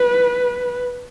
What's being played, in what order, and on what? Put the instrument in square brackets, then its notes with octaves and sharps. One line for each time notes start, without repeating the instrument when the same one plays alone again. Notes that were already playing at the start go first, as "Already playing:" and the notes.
Already playing: [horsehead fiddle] B4